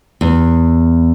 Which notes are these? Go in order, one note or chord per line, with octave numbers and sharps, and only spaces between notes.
E2